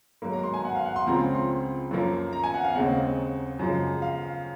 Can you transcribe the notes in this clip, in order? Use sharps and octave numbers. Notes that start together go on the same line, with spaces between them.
G#2 F#3 A#3
A#5
C6
G#5
F#5
F5
F#5
C6
C#2 C#3 F3 C4 A#5
C6
F#2 F3 A#3
A#5
G#5
F#5
F5
D#2 C#3 G#3 C4 F#5
F#2 C#3 F3 G#3
F5